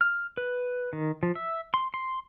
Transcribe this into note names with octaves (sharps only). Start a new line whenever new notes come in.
F6
B4
D#3
F3
E5
C6
C6